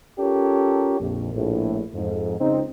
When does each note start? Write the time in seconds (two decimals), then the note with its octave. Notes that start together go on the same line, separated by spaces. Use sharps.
0.19 C#4 F4 G4 A4 A#4 C#5
1.00 A#1 F2
1.34 A#1 A2
1.94 F2 G#2
2.40 C#2 C4 D#4